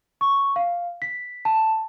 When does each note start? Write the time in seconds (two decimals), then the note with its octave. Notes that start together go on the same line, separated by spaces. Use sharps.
0.21 C#6
0.56 F5
1.02 B6
1.45 A5